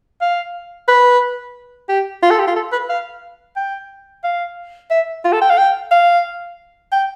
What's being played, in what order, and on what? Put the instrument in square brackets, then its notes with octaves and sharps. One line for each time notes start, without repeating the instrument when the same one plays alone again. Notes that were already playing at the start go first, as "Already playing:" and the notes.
[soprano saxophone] F5
B4
G4
F4
A4
G4
F4
A4
B4
F5
G5
F5
E5
F4
A4
G5
F5
G5
F5
G5